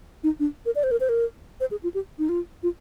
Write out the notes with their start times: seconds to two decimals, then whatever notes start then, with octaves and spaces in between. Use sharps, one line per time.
0.24 D#4
0.40 D4
0.66 A#4
0.75 D5
0.83 C5
0.91 A#4
1.00 C5
1.09 A#4
1.60 C5
1.71 G#4
1.83 F4
1.94 G4
2.19 D#4
2.29 F4
2.63 F4